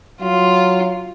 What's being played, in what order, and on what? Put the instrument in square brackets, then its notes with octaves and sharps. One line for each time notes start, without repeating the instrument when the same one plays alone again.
[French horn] F#3 [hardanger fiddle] F4